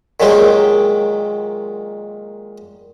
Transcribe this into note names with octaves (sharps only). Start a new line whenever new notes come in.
A#2 D#3 F#3 G#3 G4